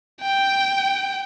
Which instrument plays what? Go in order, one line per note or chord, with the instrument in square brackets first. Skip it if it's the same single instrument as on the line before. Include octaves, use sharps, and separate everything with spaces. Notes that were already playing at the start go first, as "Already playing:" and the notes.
[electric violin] G5